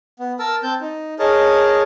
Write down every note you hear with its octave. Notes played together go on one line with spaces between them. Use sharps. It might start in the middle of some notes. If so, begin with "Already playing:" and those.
B3
A#4 A5 E6
C4 A5 G6
D#4
G#4 A#4 C#5 D#5 A5